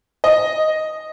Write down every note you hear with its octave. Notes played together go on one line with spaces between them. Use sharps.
D#5